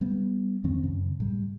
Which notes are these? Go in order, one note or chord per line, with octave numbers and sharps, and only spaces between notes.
G3 B3
F2 D#3 C4 C#4
F#2 C#3
A2 G3